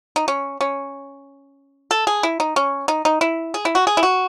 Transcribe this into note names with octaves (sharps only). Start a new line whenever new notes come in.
D#4
C#4
C#4
A4
G#4
E4
D#4
C#4
D#4
D#4
E4
G#4
E4
F#4
G#4
E4
F#4